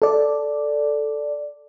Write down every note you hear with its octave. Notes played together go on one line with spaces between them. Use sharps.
A4 D5